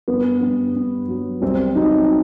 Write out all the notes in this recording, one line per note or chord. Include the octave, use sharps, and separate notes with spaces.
G2 B3
G2
G2
F#3
C2 C4
F#3 D#4